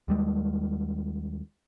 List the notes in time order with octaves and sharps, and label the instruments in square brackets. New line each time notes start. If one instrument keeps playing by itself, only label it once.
[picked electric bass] D#2 G3 G#3